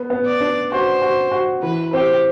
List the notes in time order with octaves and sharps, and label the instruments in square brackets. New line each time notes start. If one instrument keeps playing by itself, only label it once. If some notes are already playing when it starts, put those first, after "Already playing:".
Already playing: [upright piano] B3
B3
[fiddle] D5
[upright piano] D4
[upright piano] F#4 [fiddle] C5
[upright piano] F#4
F#4
[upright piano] E3 [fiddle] B4
[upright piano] C4 [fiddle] G4